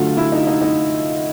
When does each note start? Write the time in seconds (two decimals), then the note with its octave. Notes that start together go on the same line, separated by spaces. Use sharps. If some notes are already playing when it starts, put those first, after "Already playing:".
Already playing: D3 F#3 A3 F4
0.17 E4
0.32 D#4
0.47 D#4
0.62 D#4